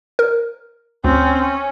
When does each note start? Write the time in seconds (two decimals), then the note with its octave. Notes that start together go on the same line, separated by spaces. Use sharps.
0.19 A#4
1.04 D2 C4 C#4
1.41 C#4